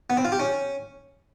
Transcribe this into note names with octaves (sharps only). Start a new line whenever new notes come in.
B3
C4
F4
G4
C#4